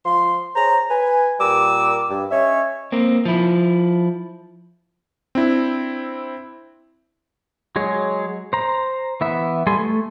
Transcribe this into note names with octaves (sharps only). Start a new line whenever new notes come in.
F3 C6
G#4 C5 C#5 A#5
B4 G#5
A#2 G3 A#4 D6 E6
G2
C#4 C#5 D#5 E5
A#3 C4
F3 E4
C4 D4 E4
F#3 G#3 G#4 C#5
C5 A#5
E3 B3 E5
G3 A4 G#5 C6
A3